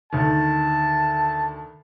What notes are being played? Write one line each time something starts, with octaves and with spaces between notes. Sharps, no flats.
D2 D#3 A5